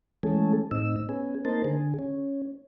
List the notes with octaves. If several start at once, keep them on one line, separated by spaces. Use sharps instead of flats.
E3 G#3 A3 C#4 G#4 A4
A2 C4 D#4 E6
B3 C#4 G#4
A#3 C4 D#4 A#4 C5 A5
D3 G#4
C#4